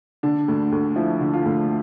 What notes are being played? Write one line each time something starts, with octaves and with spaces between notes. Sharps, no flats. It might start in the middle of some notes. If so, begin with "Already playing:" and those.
D3 D4
D2
D2
F3 E4
D3
F4
D2